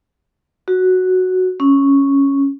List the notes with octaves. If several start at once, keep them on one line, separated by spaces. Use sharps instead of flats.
F#4
C#4